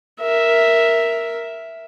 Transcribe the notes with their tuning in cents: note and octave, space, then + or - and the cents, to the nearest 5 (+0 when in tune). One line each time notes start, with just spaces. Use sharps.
A#4 +0 E5 +0